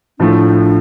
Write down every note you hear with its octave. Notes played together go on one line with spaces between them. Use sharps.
A2 F3 A3 D4